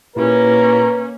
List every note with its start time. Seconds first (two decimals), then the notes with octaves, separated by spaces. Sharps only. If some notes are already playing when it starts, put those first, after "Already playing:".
0.16 A#2 A#3 C#4 E4 G4 A#4 B4